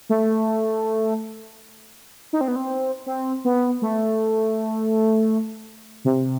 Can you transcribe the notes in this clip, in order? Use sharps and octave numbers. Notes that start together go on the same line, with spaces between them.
A3
D#4
C4
B3
C4
C4
B3
A3
C3